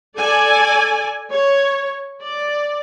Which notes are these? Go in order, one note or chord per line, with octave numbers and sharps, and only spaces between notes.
A4 D5 G#5
C#5
D5